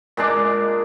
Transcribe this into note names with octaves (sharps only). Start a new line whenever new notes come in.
A#2 G#3 D4 D6